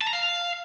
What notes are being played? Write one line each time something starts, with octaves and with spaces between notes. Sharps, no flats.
A5
A#5
F5